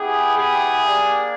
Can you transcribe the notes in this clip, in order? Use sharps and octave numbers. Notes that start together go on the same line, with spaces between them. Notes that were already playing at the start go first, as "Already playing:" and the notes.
Already playing: B3 E4 G4 G#4
G#4
A#3 D4 G4